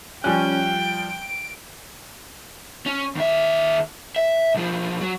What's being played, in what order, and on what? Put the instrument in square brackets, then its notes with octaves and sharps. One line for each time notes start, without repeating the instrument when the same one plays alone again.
[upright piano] F3 G3 F#6 [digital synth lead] C#4 [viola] G5
[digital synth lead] D7
[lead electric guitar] C#4
D#2 E5
E5
B1 F3
F#3